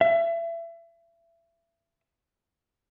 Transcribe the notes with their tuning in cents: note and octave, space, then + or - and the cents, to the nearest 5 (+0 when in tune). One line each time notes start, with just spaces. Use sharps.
E5 +30